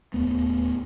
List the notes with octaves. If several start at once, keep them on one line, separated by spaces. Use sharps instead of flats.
D1 D#2 A3 B3